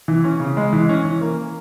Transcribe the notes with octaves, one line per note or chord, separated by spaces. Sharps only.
E3
C#4
C#3
G#3
E3
C#4
E3
A#3